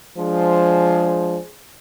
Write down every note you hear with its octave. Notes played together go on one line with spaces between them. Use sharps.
F3 G#3 D4 G#4 C5